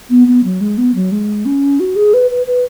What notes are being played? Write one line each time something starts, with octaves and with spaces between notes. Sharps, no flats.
B3
B3
F#3
G#3
B3
F#3
G#3
C#4
F#4
G#4
B4
B4
B4